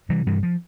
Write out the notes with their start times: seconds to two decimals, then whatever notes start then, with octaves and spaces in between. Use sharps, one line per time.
0.09 C3 E3 G3
0.26 G2 E3 G3
0.43 F3